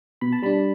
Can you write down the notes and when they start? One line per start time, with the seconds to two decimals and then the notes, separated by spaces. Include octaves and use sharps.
0.21 B2 B5
0.33 A5
0.42 G3 D4 B5